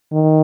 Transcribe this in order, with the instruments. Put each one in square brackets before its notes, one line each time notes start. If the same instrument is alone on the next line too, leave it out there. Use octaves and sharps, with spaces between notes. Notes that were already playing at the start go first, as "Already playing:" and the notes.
[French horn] D#3